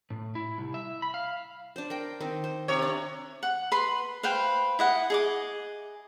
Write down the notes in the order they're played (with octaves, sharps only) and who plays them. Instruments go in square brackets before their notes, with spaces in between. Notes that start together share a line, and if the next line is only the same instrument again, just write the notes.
[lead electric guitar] A2
E4
C2
E5
B5
F5
[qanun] D4 C5
A#4 G5
D#3 C4
C5
[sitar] C3 C#5
[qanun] D4
[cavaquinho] F#5
B4 B5 C6
B4 C5 F5 G5
E4 D#5 F#5
G#4 D#5 D6